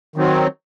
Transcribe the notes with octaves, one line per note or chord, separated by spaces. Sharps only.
D#3 F#3 C4